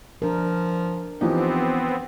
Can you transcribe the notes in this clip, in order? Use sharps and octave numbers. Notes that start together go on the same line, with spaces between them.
F3 D4 A#4
E3 F3 B3 C4 D#4 G4